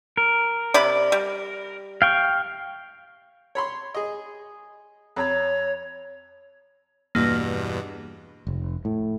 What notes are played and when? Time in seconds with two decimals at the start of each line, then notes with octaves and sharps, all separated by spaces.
0.17 A#4
0.74 C3 D5 B5
1.12 G3
2.02 F5 G5 C#6
3.55 C#5 B5 C6
3.95 G#4 D#5
5.16 F2 C#5 A#5 B5
7.15 E2 G2 B2 A#3
8.47 F1
8.85 A2